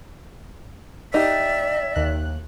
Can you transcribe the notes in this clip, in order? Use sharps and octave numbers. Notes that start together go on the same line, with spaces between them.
D#4 G4 D5 E5
D#2 F#6